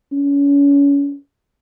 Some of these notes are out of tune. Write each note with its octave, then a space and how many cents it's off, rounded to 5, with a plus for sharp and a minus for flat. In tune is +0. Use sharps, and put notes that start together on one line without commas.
C#4 +30